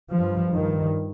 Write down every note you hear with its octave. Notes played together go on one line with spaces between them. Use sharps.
G2 F3
G2 D#3